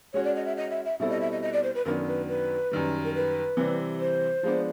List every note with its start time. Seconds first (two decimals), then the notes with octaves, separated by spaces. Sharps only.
0.13 G#3 C#4 F#4 C#5
0.24 D5
0.36 D#5
0.46 E5
0.57 D#5
0.71 E5
0.85 E5
1.00 B2 G3 C4 E4 A4 E5
1.10 D#5
1.21 E5
1.32 D#5
1.42 D#5
1.53 D5
1.63 C5
1.75 B4
1.85 F#2 D#3 F#3 B3 D4 A#4
2.07 B4
2.28 B4
2.71 F#2 D#3 G3
3.04 A#4
3.14 B4
3.57 C3 E3 G3 C4
4.00 C5
4.43 F3 G#3 B3 D4